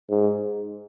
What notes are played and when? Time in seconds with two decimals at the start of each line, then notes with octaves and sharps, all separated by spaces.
0.10 G#2